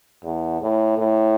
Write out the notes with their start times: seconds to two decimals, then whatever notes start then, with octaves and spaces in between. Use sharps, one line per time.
0.24 E2
0.62 A2
0.98 A2